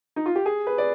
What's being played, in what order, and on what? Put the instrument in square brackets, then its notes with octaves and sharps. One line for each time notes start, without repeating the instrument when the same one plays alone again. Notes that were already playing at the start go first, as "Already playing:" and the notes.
[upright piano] D#4
F4
G4
G#4
B4
D5